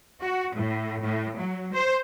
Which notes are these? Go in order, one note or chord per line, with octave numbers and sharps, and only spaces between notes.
F#4
A2
A2
F#3
C5